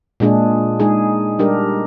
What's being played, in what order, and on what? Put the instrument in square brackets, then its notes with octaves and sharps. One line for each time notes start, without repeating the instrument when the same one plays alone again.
[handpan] A#2 G#3 D4 G#4
G#3 D#4 G#4
G3 D4 G4 A#4